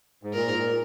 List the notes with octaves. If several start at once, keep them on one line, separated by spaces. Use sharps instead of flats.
G#2
A#2 A#4
G#2
A#2